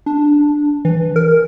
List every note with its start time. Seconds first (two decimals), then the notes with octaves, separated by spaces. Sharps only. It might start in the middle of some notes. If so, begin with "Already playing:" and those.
0.06 D4
0.85 E3
1.16 A#4